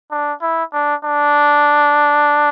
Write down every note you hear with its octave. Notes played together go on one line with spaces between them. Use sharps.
D4
E4
D4
D4